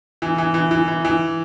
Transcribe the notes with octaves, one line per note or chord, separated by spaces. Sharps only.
E3
E3
E3
E3
E3
E3